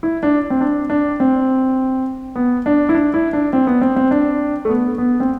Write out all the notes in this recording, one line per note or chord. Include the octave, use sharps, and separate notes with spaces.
E4
D4
C4
D4
D4
C4
B3
D4
E4
D4
E4
D4
C4
B3
C4
C4
D4
A3
B3
B3
C4